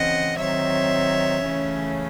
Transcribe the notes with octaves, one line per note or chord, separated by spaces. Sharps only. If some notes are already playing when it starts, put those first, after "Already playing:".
Already playing: C#3 E3 C4 D#5 F#5
D#3 F#3 C4 C#5 E5
C#3 E3 A3 C#4